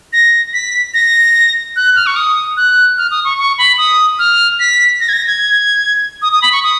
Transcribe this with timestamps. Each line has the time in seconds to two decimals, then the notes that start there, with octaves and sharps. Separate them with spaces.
0.13 A#6
0.53 B6
0.94 A#6
1.76 F#6
1.96 F6
2.06 C#6
2.16 D#6
2.57 F#6
2.98 F6
3.11 D#6
3.25 C#6
3.38 C#6
3.58 B5
3.78 D#6
4.19 F6
4.60 B6
5.00 A#6
5.09 G#6
5.13 A#6
5.27 G#6
6.22 D#6
6.32 D#6
6.42 B5
6.52 C#6
6.64 D#6